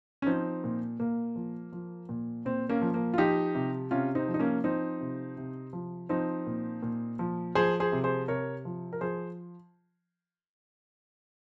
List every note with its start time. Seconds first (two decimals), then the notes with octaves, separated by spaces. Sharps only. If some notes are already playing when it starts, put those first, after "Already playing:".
0.22 C#4
0.26 F3 C4 D#4
0.64 A#2
0.99 A#2 A#3
1.36 F3
1.72 F3
2.09 A#2
2.45 A#2 C4
2.69 A#3 C#4
2.82 F3
2.94 A#3
3.14 F4
3.18 F3 D#4 G4
3.55 C3
3.91 C3 C#4 F4
4.15 C4 D#4
4.28 F3
4.34 D#4
4.39 A#3 C#4
4.64 F3 C4 D#4
5.01 C3
5.37 C3
5.73 F3
6.09 F3 C4 D#4
6.46 A#2
6.82 A#2
7.19 F3
7.55 F3 G#4 C5
7.80 G#4 C5
7.92 C3
8.04 G#4 C5
8.28 C3 A#4 C#5
8.65 F3
8.93 A#4
9.01 F3 G#4 C5